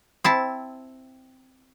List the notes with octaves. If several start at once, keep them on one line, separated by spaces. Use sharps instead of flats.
C4 E4 A5